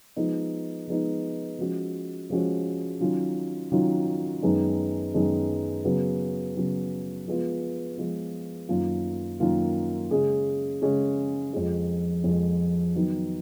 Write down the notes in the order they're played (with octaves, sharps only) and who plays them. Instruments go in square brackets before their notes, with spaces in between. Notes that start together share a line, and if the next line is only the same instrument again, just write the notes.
[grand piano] F3 G#3 B3 D#4
F3 G#3 B3 D#4
F3 G#3 C#4 F#4
F3 G#3 C#4 F#4
D#3 F#3 C#4 F4
D#3 F#3 C#4 F4
F#2 D#3 G#3 B3
F#2 D#3 G#3 B3
C#3 F#3 B3
C#3 F#3 B3
F3 G#3 B3 F4
F3 G#3 B3 F4
F#2 D#3 A#3 F4
F#2 D#3 A#3 F4
C#3 G#3 C#4 G#4
C#3 G#3 C#4 G#4
F2 F3 G#3
F2 F3 G#3
D#3 F#3 B3